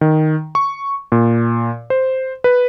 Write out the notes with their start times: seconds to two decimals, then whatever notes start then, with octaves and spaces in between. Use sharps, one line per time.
0.01 D#3
0.55 C#6
1.12 A#2
1.90 C5
2.44 B4